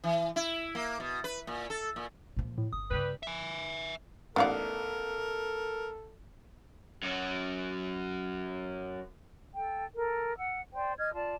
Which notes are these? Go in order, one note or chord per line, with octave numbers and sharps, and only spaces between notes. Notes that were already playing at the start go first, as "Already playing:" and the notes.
E3
E4
A#3
B2
B4
A#2
A4
A#2
A#2 F3
A2
G1 D#6
G2 C#3 G3 B4
E5 G#5
A1 B3 D#4 A4 A#4 D5 F5 F#5
F#2 F#3
A4 G5
A4 A#4
F#5 E6
C5 D5 G5
D#5 F6 G#6
F4 D5 A5